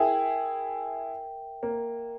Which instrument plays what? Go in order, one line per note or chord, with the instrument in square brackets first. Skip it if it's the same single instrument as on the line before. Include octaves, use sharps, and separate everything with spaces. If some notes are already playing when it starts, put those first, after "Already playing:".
Already playing: [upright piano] E4 G#4 [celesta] A#4 E5 G5
[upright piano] A#3